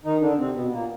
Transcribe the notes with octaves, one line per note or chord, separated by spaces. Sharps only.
D#3 D#4
D3 D4
C3 C4
B2 B3
B3
A#2 A#3